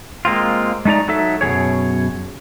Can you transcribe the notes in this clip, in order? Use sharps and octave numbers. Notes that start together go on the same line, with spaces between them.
G#3 A#3 C4 F4
G#3 A3 D#4 D5 A#5
F#3 D#4 A4 E5
F#2 B2 F3 G#4 C#5